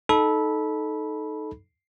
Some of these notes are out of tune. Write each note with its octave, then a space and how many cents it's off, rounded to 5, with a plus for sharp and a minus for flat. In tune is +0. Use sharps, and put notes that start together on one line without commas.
D#4 +0 A4 -15 B5 -15